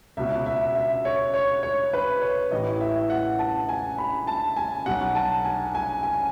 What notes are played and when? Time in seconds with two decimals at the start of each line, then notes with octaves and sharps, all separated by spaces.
0.17 C#2 B2 E5
0.46 E5
0.75 E5
1.05 C#5
1.34 C#5
1.63 C#5
1.93 B4
2.22 C#5
2.51 A1 A2 E3 D#5
2.81 E5
3.10 F#5
3.39 A5
3.69 G#5
3.98 B5
4.27 A5
4.56 G#5
4.86 B1 B2 F#5
5.15 A5
5.45 G#5
5.75 G#5
6.03 G#5